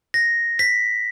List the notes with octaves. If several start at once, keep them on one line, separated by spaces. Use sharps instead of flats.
A#6
B6